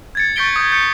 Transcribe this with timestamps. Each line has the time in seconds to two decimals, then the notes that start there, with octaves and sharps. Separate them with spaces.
0.15 G#6 A6 C#7
0.36 C#6 G6 A6 B6 D7 G7
0.56 D#6 G6 G#6
0.72 G6 C#7